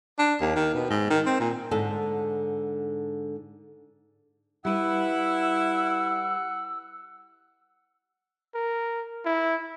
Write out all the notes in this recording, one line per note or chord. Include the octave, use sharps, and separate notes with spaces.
D4
D#2
D#3
B2
G#2
D#3
C4
A#2
G#2 D3 A4
G3 E4 B4 F#5 E6
A#4
E4